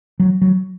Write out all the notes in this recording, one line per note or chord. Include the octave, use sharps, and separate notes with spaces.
F#3
F#3